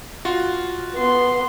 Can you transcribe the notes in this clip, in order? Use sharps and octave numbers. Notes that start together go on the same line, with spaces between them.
F4 F#4
B3 C6